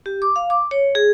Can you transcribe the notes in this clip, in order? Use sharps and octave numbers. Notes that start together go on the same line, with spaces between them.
G4
D6
F5
D6
C#5
G#4